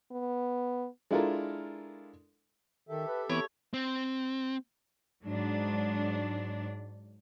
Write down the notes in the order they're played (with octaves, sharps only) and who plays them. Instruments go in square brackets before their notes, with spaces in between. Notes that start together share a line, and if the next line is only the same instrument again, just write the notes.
[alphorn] B3
[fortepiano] G#3 D4 E4 F4 A4 A#4
[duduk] D#3 [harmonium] G4 A4 E5
[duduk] B4
[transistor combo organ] E3 B3 D6 [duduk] C4 [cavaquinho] C#5
[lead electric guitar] C4
[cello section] G#2 F#3 D4